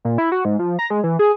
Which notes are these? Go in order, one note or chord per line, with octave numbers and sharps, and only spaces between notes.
A#2
E4
F#4
G#2
F3
A#5
G#3
E3
G#4